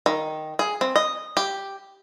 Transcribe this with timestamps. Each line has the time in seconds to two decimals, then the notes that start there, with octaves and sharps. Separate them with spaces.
0.06 D#3
0.59 G#4
0.81 C4
0.96 D#5
1.37 G4